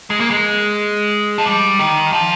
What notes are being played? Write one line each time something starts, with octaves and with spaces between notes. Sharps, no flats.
G#3
A#3
G#3
F3
G3
D#3
F3